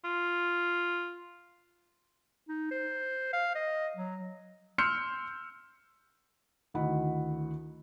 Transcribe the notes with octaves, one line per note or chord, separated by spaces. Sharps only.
F4
D#4
C5
F5
D#5
F#3
C6 E6 F6 G6 C#7
D2 D#3 E4 D#5 F#5 B5